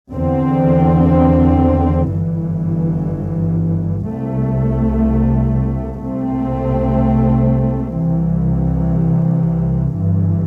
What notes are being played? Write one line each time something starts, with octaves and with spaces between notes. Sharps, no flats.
E2 D3 C4
G1 G2 E3
C2 C3 A3
C2 C3 A3 C4
C2 C3 E3
G1 G2 E3